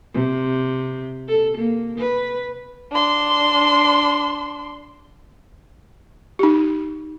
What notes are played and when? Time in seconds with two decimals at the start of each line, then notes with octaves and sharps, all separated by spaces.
0.14 C3
1.28 A4
1.58 A#3
1.98 B4
2.92 D4 C6
6.39 D#4 G4